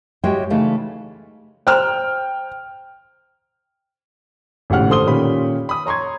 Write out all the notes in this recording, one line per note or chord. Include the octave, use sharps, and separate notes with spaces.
G#3 F#4 G4 C#5 E5 G5
C#3 E3 A3 D#4 F5
C5 G5 A#5 C6 F6
G#1 A2 C#3 G4 F#5 F6
D3 A4 C5 C6 D#6 G7
A#2 D#3 C#4 G4 B5
B5 D#6
C#5 A#5 C6 C#6 G#6